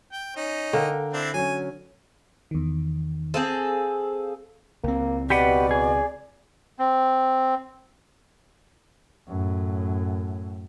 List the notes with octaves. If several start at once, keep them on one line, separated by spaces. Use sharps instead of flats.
G5
C#4 D#4
D3 A#4 F5 G5
C4 D4 E4
F#3 C#4 G#5
E2 D#3
C4 G#4 A4 C5 F5
C#2 A#3 C4
B2 G4 B4 D5 F#5
G#4
C4
F#2 A2